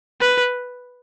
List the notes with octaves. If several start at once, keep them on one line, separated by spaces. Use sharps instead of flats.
B4